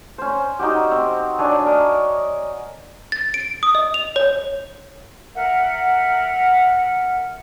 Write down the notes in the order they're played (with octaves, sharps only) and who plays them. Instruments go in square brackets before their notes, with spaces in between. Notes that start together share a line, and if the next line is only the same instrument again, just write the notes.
[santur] C#4 C5
D#4 F#4 G4
C4
D4 C#5 G#5
A#4 D#5
[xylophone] A6
D7
D#6
D#5
F7
C#5
[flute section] A#4 E5 F#5